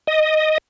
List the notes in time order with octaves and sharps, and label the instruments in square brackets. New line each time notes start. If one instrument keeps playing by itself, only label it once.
[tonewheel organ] D#5